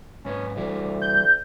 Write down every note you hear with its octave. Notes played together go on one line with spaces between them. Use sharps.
G#2 C#4 B4 D#5
D2 E3 G3 E4
G6